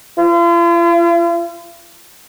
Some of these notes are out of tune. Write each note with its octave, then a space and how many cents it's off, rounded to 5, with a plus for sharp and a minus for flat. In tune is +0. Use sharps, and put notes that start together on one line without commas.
F4 -45